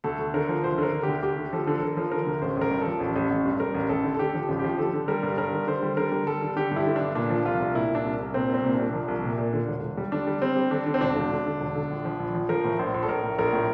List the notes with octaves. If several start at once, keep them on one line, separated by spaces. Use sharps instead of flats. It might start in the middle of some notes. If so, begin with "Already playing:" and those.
D2 A4
D2
D3 A#4
F3
D2 C5
D3 A#4
D3
D2 G4
D2 G4
D3
F3 A4
D3
A4
D3 A#4
F3
D3 A#4
D2
A1 C5
A1 A#4
G2
F3 A4
A1
A1
A1
G2
G2 A#4
A1
A1 A4
D3
A4
D3 G4
F3
A1
F3 G4
D3 A4
D3
G3 A#4
G2
G2 A#4
D3
D3 C5
G3
D3 A#4
G3
G3 A4
D3
D3 G4
G2 E4
D3
G2 D4
A#2 D4
F3
C2 F4
C2
A#2 E4
A#2 D4
C2
C2
A#2 C4
C2 C4
A#2
C2 D4
F3
C2
A#2
A#2
D3
E1
E1
G3
D3 D4
G3
G3 C4
G3
D3 D4
D3
C4
E1 D4
E1
D3
D3
E1
D3
A#1
F3
A#1
F3
F3 A#4
A2
A#1 C5
A#1
A4
A#1 A#4
A2
A#1 A#4
A2